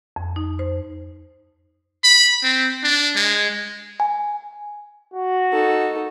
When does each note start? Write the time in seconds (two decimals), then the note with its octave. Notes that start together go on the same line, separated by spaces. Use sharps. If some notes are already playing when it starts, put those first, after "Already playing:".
0.16 F2
0.36 D#4
0.59 C5
2.04 B5
2.44 C4
2.83 D4
3.16 G#3
4.00 G#5
5.14 F#4
5.52 D#4 A4